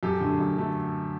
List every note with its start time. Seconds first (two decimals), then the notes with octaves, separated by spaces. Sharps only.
0.03 F#2 G4 A4
0.21 D3 F#3 A3
0.39 F#2
0.57 D3 F#3 A3